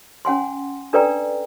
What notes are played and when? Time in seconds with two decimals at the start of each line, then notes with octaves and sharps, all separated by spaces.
0.25 C#4 F#5 G#5 C6
0.93 D4 A4 B4 D5 G5 A#5